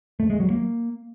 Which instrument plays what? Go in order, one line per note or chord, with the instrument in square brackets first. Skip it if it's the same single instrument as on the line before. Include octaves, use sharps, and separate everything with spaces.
[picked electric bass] A3
G#3
F#3
A#3